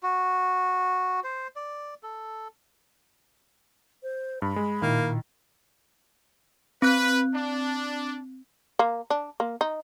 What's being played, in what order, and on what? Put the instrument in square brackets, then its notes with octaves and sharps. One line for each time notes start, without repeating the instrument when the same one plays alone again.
[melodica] F#4
C5
D5
A4
[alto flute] C5
[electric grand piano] G2 [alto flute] B5
[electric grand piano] G#3
[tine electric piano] A#2 [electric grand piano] D#3 E4 [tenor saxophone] A#3
[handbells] C4 F#6 [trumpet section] B4
[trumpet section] D4
[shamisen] A#3
D4
A#3
D#4